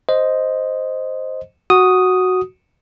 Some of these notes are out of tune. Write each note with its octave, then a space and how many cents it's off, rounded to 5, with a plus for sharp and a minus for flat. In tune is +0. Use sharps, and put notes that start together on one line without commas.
C5 +0 D#5 +0
F#4 +0 D#6 +0